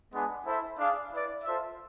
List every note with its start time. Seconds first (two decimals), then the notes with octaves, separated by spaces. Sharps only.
0.12 G#3 B3 D4 G#4
0.45 E4 A4 C5 E5
0.78 D4 G#4 D5 F5
1.11 E4 B4 D5
1.44 F4 A4 C5 E5